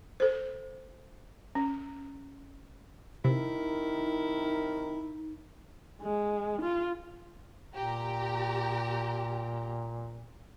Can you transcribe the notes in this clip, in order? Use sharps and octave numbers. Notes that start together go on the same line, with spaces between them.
A4 C5
C#4
C2 C3 D#3 D#4 E4 A#4
G#3
F4
A#2 G4 A#5